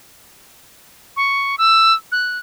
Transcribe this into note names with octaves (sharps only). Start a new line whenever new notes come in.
C#6
E6
F#6